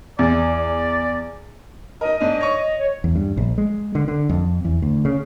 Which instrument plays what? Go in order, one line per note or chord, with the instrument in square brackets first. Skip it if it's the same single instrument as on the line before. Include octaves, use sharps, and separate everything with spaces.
[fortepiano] E2 [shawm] D5
[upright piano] D#4 A#4 [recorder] D#5
[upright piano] G#2 D4
C#5 C#6
[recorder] C#5
[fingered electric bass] E2
G2
A#1
G#3
D3
D3
F2
E2
D2
C#3